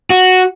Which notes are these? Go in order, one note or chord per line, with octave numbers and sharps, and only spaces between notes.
F#4